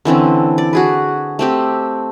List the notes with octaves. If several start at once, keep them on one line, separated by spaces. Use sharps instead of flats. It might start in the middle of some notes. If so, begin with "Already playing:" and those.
D3 E3 C4 C#4
D5
F#4 G#4 B4
A3 C4 G4